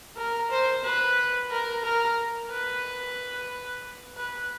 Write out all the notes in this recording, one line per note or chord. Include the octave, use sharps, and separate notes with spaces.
A#4
C5
B4
A#4
A#4
B4
B4